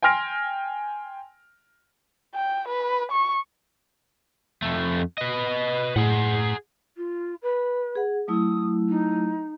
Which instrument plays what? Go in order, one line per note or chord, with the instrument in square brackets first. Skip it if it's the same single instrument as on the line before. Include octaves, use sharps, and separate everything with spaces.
[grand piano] G5 G#5 C6 F6 A#6 D7
[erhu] G5
B4
C#6
[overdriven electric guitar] F2 A3
B4 D#5
[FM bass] A2 [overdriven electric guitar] G#4 F#5
[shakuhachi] F4
B4
[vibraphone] G#4 F#5
[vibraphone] F#3 A3 E4 [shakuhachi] D#6
[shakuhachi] D#4